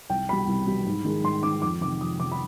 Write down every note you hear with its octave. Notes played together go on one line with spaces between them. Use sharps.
C2 G5
B2 G3 B5
C2
B2 G3
G#2
D#3 G#3
G#2 C6
D#3 G#3 D6
F2 D6
C3 D#3 D6
F2 D#6
C3 D#3 D6
B5